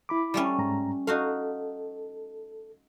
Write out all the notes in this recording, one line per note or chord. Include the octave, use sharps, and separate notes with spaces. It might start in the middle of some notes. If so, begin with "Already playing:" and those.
E4 B5 D6
G3 A3 C#4
G#2 A#5
D#4 F#4 A4 F5